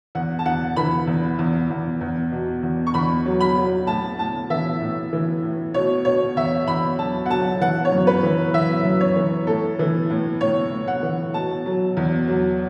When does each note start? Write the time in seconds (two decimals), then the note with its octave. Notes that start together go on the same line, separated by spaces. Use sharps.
0.15 E2 F#5
0.39 A5
0.45 E2 F#5
0.76 E3 B5
1.07 E2
1.39 E2
1.70 E2
2.01 E2
2.32 B2
2.63 E2
2.87 C#6
2.94 E2 B5
3.26 F#3
3.41 B5
3.57 F#3
3.87 A2 A5
4.18 A2 A5
4.50 E3 E5
4.81 A2
5.13 E3
5.43 A2
5.74 B2 C#5
6.05 B2 C#5
6.36 E2 E5
6.67 E2 B5
6.99 F#3 A5
7.26 F#5
7.30 F#3 A5
7.61 E3 F#5
7.85 C#5
7.92 F#2
8.07 B4
8.23 E3
8.54 E3 E5
8.85 F#2
9.01 C#5
9.16 E3
9.47 A2 A4
9.79 E3
10.10 A2
10.41 A2 C#5
10.72 A2
10.88 F#5
11.03 E3
11.34 B2 A5
11.66 F#3
11.97 E2
12.28 F#3